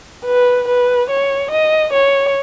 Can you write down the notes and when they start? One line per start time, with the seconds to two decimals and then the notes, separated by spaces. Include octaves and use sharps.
0.25 B4
0.68 B4
1.10 C#5
1.51 D#5
1.93 C#5